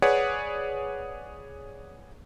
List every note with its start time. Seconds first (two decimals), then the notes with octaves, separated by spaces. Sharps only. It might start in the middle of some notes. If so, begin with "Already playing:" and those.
0.02 G#4 B4 C#5 D5 F#5